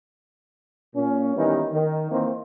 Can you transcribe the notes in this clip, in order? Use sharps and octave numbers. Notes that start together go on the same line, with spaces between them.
A#2 C#4
D#3 E3 G3 B3 C#4 D#4
D#3
D#3 E3 A#3 C4